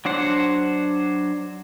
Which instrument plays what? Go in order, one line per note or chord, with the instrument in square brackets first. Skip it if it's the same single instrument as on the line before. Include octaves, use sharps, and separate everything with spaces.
[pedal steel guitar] F#3 D4 C5 F#5